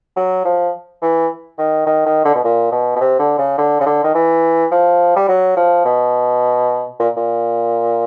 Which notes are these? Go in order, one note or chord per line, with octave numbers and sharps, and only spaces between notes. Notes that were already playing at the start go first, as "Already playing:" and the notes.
F#3
F3
E3
D#3
D#3
D#3
D3
B2
A#2
B2
B2
C3
D3
C#3
D3
C#3
D3
D#3
E3
F3
G3
F#3
F3
B2
A#2
A#2